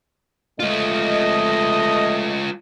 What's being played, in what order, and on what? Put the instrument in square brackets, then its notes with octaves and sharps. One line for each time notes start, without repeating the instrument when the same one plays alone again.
[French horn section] F2 A3 D#5 [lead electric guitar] G#3 F4